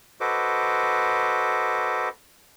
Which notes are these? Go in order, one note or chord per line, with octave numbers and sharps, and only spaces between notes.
F#4 A4 B4 C5 D#5 D6